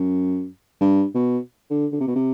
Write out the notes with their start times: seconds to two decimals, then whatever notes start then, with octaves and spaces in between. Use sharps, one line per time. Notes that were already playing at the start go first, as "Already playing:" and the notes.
Already playing: F#2
0.81 G2
1.15 B2
1.70 D3
1.92 D3
2.00 C3
2.07 B2
2.15 C3